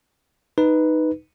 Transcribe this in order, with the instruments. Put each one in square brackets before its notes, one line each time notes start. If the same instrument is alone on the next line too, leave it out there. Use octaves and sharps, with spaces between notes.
[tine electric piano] D#4 B4